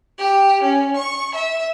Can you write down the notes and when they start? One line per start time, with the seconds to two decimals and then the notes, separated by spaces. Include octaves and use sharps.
0.18 G4
0.63 C#4
0.96 C#6
1.34 E5